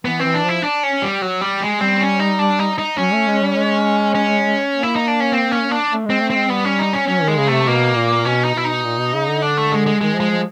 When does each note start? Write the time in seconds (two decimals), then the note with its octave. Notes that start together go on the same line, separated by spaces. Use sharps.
0.05 E3 B3
0.19 E3 C4
0.34 D4
0.43 F3
0.49 E4
0.63 D4
0.83 C#4
1.02 G3
1.22 F#3
1.41 G3
1.61 G#3
1.80 G3 C4
2.01 C#4
2.19 D#4
2.39 D4
2.59 D#4
2.78 D#4
2.98 F#3 C#4
3.13 A3
3.27 G#3
3.42 G3
3.56 G#3
4.15 C#4
4.74 A#3
4.83 E4
4.96 D#4
5.08 D4
5.20 C#4
5.32 C4
5.52 C#4
5.71 D4
5.91 A3
6.06 G#3 C4
6.20 A3
6.30 G#3 C4
6.50 G3 B3
6.65 C#4
6.79 D#4
6.93 C#4
7.08 F#3 C#4
7.23 D#3 G#3
7.38 C#3
7.48 C3 A3
7.67 B2 A#3
7.96 A#2
8.25 B2 C#4
8.45 D#4
8.55 B2 E4
8.64 D#4
8.84 A#2
8.99 B2
9.14 C#3
9.28 D3
9.42 D4
9.58 A3
9.72 G#3
9.86 G#3
10.01 D#3 G#3
10.16 F3 G#3
10.31 F3